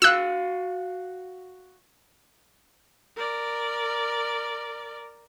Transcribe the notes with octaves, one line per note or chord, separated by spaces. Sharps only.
F#4 F5 E6 F#6
A#4 D5